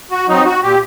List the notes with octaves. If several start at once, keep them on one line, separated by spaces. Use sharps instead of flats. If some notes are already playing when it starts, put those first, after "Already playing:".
F#4
F#3 C4 D#4
F#4
A#2 G4